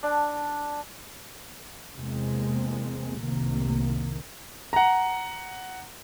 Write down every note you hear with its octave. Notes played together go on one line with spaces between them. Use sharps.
D4
E2 C3 G#3 A#3 C4
F1 C2 A2 C3 D#3 A#3
F#5 A#5